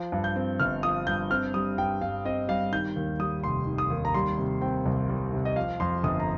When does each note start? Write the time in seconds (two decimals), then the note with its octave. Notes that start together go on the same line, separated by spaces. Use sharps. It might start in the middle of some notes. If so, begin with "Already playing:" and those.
Already playing: F3
0.12 G2
0.24 G6
0.36 C4
0.60 G1 F6
0.83 F3 D#6
1.07 G2 G6
1.30 C4 F6
1.54 G3 D#6
1.78 G2 G5
2.01 G2 F5
2.25 C4 D#5
2.49 G3 F5
2.72 D#3 G6
2.96 D#2
3.19 G3 D#6
3.44 F1 C6
3.67 D#3
3.78 D#6
3.90 D#2
4.05 A#5
4.14 G3 C6
4.38 C3
4.62 C4 G5
4.86 C2
5.09 G3
5.33 C3
5.45 D#5
5.56 F3 F5
5.80 F2 C6
6.03 G1 D#6
6.20 A#5